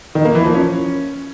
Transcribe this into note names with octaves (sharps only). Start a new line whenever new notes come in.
D#3
A#3
E3
F3
C#4